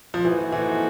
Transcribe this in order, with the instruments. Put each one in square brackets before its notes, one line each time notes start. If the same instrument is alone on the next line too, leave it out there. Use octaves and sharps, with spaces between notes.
[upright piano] F3
[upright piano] E3 [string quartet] A#3 D#4 F#4 A4 C5
[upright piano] E3